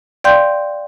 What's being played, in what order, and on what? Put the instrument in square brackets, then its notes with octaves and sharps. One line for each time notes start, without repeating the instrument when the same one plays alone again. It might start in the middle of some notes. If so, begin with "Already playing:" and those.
[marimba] D5 F5 G5 C6 G6